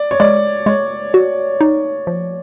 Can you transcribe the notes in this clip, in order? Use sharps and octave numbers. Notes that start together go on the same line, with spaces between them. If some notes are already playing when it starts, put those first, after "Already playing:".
Already playing: D5
C#5
G#3 D5
G#3 C#5
F#4
D#4
F3